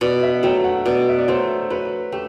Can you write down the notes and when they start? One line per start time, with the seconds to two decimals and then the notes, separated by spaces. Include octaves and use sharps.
0.01 B2 D5
0.23 E5
0.43 F#3 A3 G5
0.64 F#5
0.86 B2 D5
1.09 E5
1.18 D5
1.28 F#3 A3 C5
1.70 F#3 B4
2.12 A3 G4